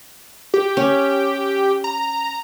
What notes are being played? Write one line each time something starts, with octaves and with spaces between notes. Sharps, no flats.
G4
C#4
A#5